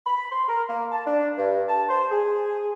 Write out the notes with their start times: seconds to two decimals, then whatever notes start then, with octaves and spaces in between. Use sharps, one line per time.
0.06 B5
0.32 C6
0.48 A#4
0.69 A#3
0.92 A5
1.06 D4
1.37 G2
1.68 A5
1.89 C5
2.11 G#4